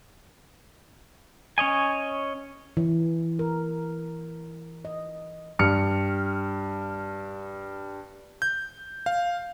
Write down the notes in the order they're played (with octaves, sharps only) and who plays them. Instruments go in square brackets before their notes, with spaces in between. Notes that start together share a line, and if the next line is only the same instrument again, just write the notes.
[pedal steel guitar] C#4 C#5 D#5 G#5
[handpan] E3
A#4
D#5
[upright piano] G2 F6 C#7
[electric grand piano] G6
F5